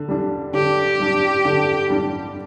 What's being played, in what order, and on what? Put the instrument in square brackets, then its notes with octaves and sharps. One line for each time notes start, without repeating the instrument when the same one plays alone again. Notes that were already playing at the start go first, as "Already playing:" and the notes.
Already playing: [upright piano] D3
G3 D4
[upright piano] D3 [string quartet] G4
[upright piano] G3 D4
D3
G3 D4